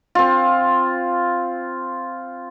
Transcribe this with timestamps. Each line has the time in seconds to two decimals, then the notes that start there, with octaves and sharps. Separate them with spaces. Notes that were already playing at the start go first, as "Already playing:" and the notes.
0.15 C4 F4